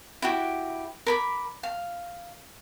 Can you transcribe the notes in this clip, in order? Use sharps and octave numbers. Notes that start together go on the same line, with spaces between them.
E4 F#4 G4
A#4 B5 D6
F5